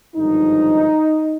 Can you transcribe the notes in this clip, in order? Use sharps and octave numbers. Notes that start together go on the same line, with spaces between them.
G#1 G2 D3 F3 D#4